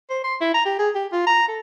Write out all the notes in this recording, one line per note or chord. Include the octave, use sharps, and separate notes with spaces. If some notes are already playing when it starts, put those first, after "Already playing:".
C5
C6
E4
A#5
G4
G#4
G4
F4
A#5
A4